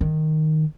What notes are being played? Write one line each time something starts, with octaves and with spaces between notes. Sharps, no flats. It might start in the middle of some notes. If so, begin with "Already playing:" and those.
D#3